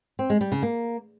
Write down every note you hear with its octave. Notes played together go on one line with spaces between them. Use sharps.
C4
G#3
G3
C#3
A#3